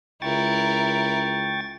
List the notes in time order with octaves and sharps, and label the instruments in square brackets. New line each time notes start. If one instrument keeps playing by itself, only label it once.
[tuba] C#2 [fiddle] E4 A#4 [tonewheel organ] G5 C#6 A6